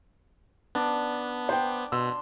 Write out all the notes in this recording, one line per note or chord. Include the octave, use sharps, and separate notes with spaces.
B3 D4
C5 G5
B2 C6 E6